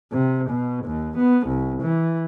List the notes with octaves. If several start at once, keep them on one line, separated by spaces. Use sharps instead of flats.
C3
B2
D#2
B3
C2
E3